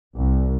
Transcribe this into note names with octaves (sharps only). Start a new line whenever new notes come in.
C2